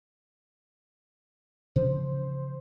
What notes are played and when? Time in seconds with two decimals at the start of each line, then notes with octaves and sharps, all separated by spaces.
1.76 C#3 E3 F3 C5